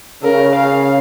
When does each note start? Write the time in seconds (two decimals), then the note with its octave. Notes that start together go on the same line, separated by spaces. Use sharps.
0.24 C#3 A#4
0.56 F5